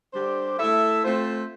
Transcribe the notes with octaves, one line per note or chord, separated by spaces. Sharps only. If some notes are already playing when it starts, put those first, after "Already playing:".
D3 G3 D4 G4 C5
A3 E4 A4 E5
A3 C4 F4 C5